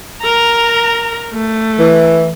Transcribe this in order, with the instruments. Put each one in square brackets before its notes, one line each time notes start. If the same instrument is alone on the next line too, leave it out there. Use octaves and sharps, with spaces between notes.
[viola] A#4 A#5
A3
[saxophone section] E3